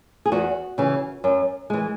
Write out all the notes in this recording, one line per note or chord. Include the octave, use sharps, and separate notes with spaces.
G#4
E2 F#4
C#3 E3
F#2
E3 G#3